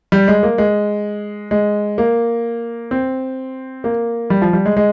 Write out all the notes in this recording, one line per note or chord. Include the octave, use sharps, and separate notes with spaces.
G3
G#3
A#3
G#3
G#3
A#3
C4
A#3
G3
F3
G3
G#3
G#3